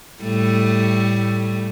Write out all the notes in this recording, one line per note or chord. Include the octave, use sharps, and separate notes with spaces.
A2 G3 A3